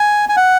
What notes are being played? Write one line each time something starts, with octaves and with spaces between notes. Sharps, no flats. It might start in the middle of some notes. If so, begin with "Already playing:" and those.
Already playing: G#5
G#5
F#5